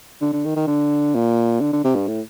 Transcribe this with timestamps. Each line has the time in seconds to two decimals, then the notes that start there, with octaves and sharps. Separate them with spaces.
0.21 D3
0.33 D3
0.45 D#3
0.56 D#3
0.67 D3
1.15 A#2
1.61 D3
1.73 D3
1.84 C3
1.95 G2
2.07 A2